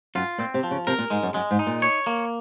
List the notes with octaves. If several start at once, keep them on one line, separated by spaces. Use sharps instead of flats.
F#2 F4
A#2 C4
C3
F3
C#3
C3 A#4
A#2
G#2 G#3
F#2
F#2 G#3
G#2
D#4
A#2
C#5
A#3